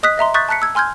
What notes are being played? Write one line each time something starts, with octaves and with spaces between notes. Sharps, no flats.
D#5 D#6 F#6 B6
D#5 E5 A#5 C6
C#6 D#6 F#6 G6 A6 B6
A5 A#5 F#6 B6 C#7
E6 G#6
G#5 C6 F6 G6 G#6